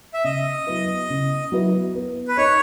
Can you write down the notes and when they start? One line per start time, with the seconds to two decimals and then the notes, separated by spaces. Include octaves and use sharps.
0.14 E5
0.24 C#3 D#5
0.67 F#3 B3 E4 B4
1.10 C#3
1.52 F#3 B3 E4 B4
1.95 B3
2.28 B4
2.37 D#4 A#4 C#5 D#5